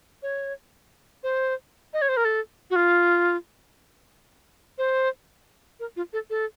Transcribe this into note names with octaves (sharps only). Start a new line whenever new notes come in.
C#5
C5
D#5
C#5
C5
A#4
A4
F#4
F4
C5
A#4
F4
A4
A4